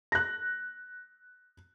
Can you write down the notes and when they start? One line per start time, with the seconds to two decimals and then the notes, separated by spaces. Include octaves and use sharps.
0.12 F#6 A#6